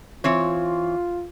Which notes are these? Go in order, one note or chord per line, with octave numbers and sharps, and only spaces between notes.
E3 C4 F4 C#5